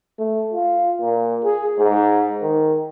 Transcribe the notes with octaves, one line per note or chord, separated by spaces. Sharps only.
A3
F4
A#2
G#4
G#2
D#3